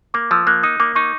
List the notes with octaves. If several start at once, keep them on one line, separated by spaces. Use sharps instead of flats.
A#3 D6
F3 E6
A#3 F#6
D#4 D#6
A#3 D6
D#4 C#6